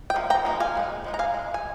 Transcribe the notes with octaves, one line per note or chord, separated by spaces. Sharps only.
G5
F3 A#3
G5 A#5
F3 A#3 D#4
F5 G#5
F3 G#3 D#4
F3 G#3 D#4
A#5
F5 G#5
D#3 G#3
G#5